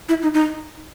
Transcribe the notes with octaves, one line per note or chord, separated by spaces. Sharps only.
E4
D#4
D#4